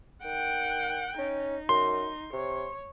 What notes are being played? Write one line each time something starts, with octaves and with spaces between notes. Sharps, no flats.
D#3 F#5 G5
C#4 D#4
F#2 C6
C3 C#5